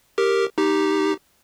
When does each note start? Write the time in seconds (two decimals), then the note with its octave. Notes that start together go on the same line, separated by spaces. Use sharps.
0.18 G4 A#4
0.58 D#4 G4